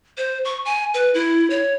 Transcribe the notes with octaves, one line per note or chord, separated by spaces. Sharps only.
C5
C#6
G#5
B4
E4
C#5